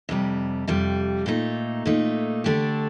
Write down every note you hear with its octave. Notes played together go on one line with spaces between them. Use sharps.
F2 C3 G3
F2 C3 G3
A#2 A3 D#4
A#2 A3 D#4
D3 A3 D4 G4